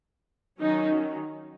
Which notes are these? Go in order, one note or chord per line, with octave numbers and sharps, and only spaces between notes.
D#3 F#3 C#4 D#4